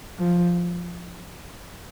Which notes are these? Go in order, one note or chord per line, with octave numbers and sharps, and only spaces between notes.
F3